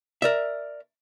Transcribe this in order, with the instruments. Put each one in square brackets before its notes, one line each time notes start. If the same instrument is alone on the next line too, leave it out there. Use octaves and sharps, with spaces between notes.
[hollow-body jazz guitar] A#4 D5 E5